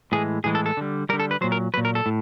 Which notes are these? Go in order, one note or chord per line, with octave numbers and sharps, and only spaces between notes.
A2 E3 G#3 G#4
A2 E3 G#3 G#4
A4
A4
D3 G3
D3 G3 A#4
A4
B4
A#2 F#3 C5
A#4
A#2 F#3 B4
A#4
A4
A2